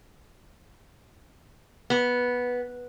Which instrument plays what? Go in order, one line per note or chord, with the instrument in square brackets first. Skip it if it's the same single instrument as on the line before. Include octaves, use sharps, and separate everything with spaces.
[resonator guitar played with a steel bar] B3